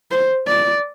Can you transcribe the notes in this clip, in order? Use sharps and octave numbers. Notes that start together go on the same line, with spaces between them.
C5
D5